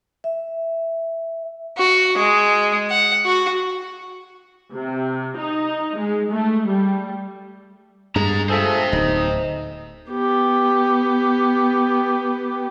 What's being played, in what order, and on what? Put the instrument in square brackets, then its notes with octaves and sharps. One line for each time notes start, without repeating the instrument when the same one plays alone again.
[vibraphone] E5
[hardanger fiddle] F#4
G#3
F#5
F#4
[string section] C3
D#4
G#3
A3
G3
[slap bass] G2 G#3 [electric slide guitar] G#4 A#5
[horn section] F4 G#4 A4 [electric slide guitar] C5 E5
[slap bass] D1 [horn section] D#4
[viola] B3 G4